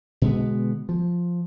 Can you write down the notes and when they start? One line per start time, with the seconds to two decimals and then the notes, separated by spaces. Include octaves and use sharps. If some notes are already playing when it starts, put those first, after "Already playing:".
0.22 B2 D3 G#3 B3
0.89 F3